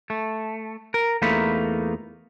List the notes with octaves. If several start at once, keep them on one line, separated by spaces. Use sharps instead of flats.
A3
A#4
E2 A3 A#3 D#4 F4 B5